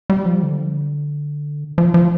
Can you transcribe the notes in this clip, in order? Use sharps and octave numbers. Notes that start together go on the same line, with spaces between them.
G3
F3
D3
F3
F3